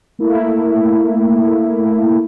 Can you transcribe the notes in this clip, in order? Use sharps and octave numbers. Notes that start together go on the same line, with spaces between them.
A3 A#3 E4